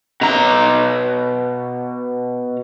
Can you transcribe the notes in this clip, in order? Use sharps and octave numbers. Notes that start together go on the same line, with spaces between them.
B2 A#5